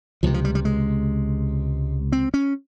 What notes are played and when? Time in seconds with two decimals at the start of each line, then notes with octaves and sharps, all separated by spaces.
0.23 C#2 C3 F3
0.34 F3
0.45 G3
0.55 G3
0.65 G#3
2.12 C4
2.34 C#4